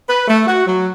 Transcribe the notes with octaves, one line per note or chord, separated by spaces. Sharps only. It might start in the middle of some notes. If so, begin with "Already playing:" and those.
B4
A3
F#4
F#3